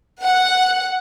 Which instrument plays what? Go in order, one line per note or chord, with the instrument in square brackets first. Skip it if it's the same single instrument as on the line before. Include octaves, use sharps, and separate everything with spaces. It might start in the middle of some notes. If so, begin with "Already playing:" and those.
[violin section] F#5